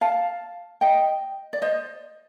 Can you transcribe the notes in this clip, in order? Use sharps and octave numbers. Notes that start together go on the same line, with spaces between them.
F5 A5
D#5 G5
D5
C5 D#5